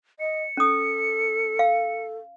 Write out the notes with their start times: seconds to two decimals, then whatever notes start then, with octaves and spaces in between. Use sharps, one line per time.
0.20 D#5 C#7
0.57 C#4 A4 D#6
1.59 F5